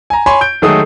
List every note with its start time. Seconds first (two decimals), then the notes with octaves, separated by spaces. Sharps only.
0.10 G#5 A#5
0.26 C#5 G#5 B5 C6
0.41 G6 D7
0.62 D#3 F#3 G#3 A3 D#6